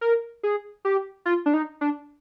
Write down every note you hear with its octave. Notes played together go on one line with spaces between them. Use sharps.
A#4
G#4
G4
F4
D4
D#4
D4